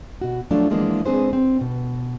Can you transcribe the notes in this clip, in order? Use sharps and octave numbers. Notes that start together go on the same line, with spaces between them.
B2 F#4
F3 F#3 A3 D4 F4
E3 F3 G#3 A#3 B3 D4
G#3 C4 D4 G#4 B4 C5
C4
B2